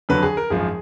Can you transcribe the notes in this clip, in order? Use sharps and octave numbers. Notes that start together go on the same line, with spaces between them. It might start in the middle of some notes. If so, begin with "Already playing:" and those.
F2 D3 F#3 B4
G#4
A#4
G#1 F#2 F3 G#4